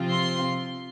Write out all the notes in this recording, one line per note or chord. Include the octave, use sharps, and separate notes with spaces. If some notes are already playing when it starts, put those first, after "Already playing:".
Already playing: C3 F3 C4 F4
C6